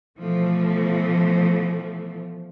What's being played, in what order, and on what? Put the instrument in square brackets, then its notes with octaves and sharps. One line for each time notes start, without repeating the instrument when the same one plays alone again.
[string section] B2 E3 F3 A3